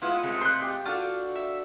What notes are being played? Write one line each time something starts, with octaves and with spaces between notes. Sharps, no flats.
G#3 B3 E4 F4
C3 G#3 A3
C5 C6 F#6
G4
D4 F4 F#4 A4
E5